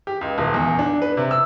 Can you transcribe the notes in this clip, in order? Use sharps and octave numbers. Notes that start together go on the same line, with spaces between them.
G4
C#2
D#1
E2
D4
B4
C3
E6